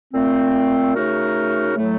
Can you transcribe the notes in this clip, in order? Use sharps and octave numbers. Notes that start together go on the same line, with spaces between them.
A#2 A3 C4
C#3 A3 D#4 F#4 A#4
A2 F#3 A3